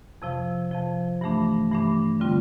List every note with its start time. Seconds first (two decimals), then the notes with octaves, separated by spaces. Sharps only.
0.22 F2 C3 F3
0.71 F2 C3 F3
1.21 G2 E3 A3 D4
1.71 G2 E3 A3 D4
2.20 D3 G3 C4 F4